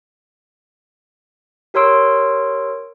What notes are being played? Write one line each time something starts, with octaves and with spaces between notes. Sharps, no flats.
G4 A#4 C#5 C6 E6 D7